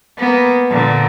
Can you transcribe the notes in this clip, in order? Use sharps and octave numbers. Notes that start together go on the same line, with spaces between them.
A#3 B3
A#2 D3